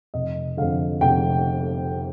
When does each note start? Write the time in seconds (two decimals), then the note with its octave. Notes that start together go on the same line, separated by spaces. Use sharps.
0.14 F1 D#5
0.57 F2 D3 F5
1.01 F1 G5